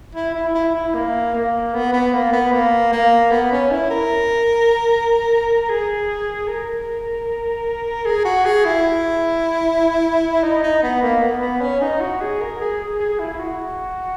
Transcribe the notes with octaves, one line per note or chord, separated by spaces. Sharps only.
E4
E4
E4
E4
A#3
A#3
B3
B3
A#3
B3
A#3
A#3
B3
C#4
E4
A#4
G#4
A#4
G#4
F#4
G#4
E4
D#4
D#4
B3
A#3
B3
B3
C#4
D#4
F#4
G#4
A#4
G#4
G#4
G#4
E4
E4
F#4